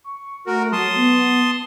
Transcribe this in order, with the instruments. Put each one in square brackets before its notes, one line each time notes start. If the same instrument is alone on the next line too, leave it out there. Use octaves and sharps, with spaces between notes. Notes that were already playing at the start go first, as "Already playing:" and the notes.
[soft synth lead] C#6
[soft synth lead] A3 [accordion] F#4 A#4
[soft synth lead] F#3 [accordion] A5 C6 D#6
[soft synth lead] B3